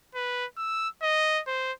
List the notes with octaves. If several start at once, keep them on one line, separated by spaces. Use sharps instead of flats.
B4
E6
D#5
C5